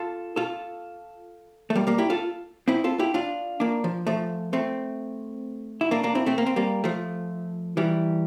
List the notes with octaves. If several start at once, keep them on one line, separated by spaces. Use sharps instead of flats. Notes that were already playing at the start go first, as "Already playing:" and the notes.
Already playing: F4 A4
F4 A4
A3
G3 A#3
G3 A#3
E4 G4
F4 A4
C4 E4
F4 A4
E4 G4
D4 F4
A#3 D4
F3
F3 A3
A3 C4
E4
A#3 D4
A#3 D4
C4 E4
A3 C4
A#3
C4
G3 A#3
F3 A3
E3 G3